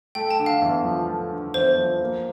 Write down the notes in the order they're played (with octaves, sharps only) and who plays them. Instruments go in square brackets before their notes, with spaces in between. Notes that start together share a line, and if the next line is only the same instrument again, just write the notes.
[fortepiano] A3 [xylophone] G5
[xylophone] A5
[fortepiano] D3
[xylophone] F5
[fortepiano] E2
F3
A3
D3
[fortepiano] E2 [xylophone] C5
[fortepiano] F3
A#3